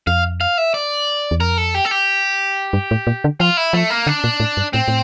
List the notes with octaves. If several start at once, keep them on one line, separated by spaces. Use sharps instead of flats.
F2 F5
F5
E5
D5
E2
F2 A#4
A4
G4
A4
G4
G2
A2
A#2
D3
F3 F4
E4
F3 A3
A#3
D3 D4
A#2
A2
G2
A2 C4
A2